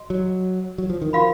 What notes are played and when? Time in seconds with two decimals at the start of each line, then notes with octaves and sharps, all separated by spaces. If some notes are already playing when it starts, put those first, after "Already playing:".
Already playing: F#4 D#5
0.10 F#3
0.78 F#3
0.90 F3
1.02 D#3
1.13 F3 F#4 A#4 F5 B5